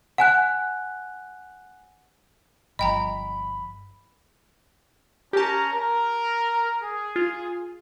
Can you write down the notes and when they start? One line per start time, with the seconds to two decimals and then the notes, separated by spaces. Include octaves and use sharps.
0.18 F#5 G#5 F#6
2.79 G1 F3 D#5 G5 A#5 B5
5.33 C#4 G4 A#4 A5 A#5
5.73 A#4
6.82 G#4
7.16 F4